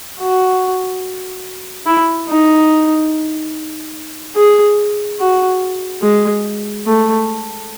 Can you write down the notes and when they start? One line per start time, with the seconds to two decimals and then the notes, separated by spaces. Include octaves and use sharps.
0.20 F#4
1.86 E4
2.28 D#4
4.36 G#4
5.20 F#4
6.02 G#3
6.86 A3